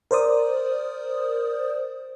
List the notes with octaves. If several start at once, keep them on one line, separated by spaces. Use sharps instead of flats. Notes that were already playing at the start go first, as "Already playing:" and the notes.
A#4 C5 D5 D#6